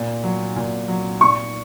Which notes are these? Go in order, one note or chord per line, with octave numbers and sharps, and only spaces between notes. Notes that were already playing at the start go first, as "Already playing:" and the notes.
Already playing: A#2
F#3
A#2
F#3
A#2 C#6